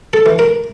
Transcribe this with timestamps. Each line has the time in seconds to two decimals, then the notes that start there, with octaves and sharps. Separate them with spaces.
0.13 A4
0.26 E3
0.39 A#4